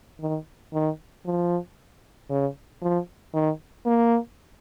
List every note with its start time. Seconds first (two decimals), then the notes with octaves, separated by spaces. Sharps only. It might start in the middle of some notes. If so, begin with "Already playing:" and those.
0.20 D#3
0.73 D#3
1.26 F3
2.30 C#3
2.82 F3
3.34 D#3
3.86 A#3